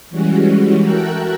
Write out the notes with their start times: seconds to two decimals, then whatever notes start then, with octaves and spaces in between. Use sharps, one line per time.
0.10 E3 G3 G#3 C#4 F#4
0.80 F#4 A4 A#4 E5 G5 F#6